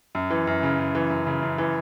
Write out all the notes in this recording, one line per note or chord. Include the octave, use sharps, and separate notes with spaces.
F#2
E3
F#2
C#3
F#2
E3
F#2
C#3
F#2
E3